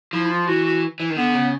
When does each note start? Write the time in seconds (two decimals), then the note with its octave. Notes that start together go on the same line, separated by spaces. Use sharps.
0.13 F3 E4
0.24 E4
0.30 F4
0.47 E3 F#4
0.65 F#4
1.00 E3
1.10 D#3
1.16 D3 B3
1.34 C#3